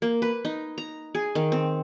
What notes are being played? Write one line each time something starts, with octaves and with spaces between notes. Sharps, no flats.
A#3
B4
D#4
A#5
G#4
D#3
C4